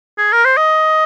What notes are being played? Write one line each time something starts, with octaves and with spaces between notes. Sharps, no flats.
G#4
A#4
C5
D#5